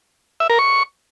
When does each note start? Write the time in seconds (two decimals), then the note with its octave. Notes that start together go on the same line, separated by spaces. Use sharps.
0.40 E5
0.50 A#4
0.59 C#6